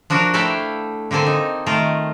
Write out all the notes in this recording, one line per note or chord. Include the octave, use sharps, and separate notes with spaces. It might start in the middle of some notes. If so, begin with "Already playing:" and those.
F3 D4 F#4 A#4
A3 E4 A4 D5 F5 G5
D3 A#3 C4 A4 G#5
D#4
D#3 A3 F4 A#4